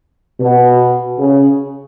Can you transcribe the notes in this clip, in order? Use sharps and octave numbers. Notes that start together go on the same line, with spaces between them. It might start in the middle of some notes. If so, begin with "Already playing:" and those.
B2
C#3